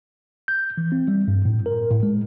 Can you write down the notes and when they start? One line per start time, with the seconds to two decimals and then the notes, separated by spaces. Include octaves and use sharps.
0.48 G6
0.77 E3
0.92 C4
1.08 G3
1.28 G2
1.45 A2
1.66 A#4
1.91 A2
2.03 G#3